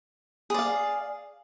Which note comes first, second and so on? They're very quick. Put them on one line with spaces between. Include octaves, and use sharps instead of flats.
G#4 D5 F5